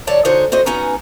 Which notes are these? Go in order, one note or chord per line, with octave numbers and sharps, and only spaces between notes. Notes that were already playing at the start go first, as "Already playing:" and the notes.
D3 F#3 C#5 D5 A5
D3 D#4 F#4 G#4 C5 C#5
D3 F#4 C5 D#5
B3 C#4 D#4 F#4 G#5 A#5